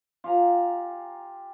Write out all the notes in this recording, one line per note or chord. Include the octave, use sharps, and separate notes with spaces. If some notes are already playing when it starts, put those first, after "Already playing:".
F4 G4 G#5 A#5